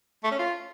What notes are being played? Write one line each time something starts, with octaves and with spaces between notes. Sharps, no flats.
A3
C#4
F4